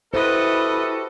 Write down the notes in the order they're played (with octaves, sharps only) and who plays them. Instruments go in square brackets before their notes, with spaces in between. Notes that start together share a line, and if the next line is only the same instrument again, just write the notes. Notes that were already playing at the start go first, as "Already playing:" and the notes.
[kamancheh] E4 [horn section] F#4 G4 A4 [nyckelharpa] B4 D#5 [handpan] C5